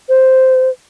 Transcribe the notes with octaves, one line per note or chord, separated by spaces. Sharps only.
C5